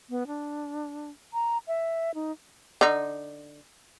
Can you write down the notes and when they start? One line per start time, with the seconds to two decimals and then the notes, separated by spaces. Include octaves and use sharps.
0.10 B3
0.27 D4
1.34 A#5
1.68 E5
2.15 D#4
2.81 D3 D#4